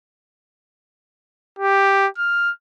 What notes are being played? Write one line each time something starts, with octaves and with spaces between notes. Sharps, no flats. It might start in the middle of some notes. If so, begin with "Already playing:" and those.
G4
F6